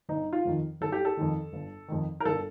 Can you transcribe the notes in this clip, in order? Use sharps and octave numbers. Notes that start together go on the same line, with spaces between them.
G1 D#4
F4
F2 D#3
G1 A4
G4
A4
F2 D#3
G1
F2 D#3
A#4
G1 A4